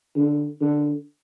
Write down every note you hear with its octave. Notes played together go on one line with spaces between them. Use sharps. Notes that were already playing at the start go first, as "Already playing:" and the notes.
D3
D3